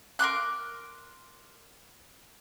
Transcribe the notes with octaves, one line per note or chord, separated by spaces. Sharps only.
A#4 C6 D6 F#6